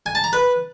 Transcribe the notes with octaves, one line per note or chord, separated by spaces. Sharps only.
G#5
A5
A#5
B4